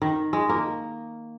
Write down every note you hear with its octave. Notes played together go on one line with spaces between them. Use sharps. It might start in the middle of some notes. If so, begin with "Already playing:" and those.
D#3
G#3
A#3